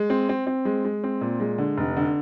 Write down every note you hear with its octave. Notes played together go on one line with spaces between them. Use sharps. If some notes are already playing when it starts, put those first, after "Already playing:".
Already playing: G#3
C4
C4
C4
G#3
G#3
C4
A#2
G#3
D3
F1
D3